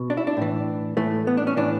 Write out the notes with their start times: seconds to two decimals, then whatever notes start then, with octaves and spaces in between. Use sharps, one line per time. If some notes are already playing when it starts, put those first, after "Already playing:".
Already playing: B2
0.10 D4
0.17 E4
0.27 D4
0.37 A2 E3
0.97 A2 E3 A3
1.27 B3
1.37 D4
1.47 C#4
1.57 A2 E3 D4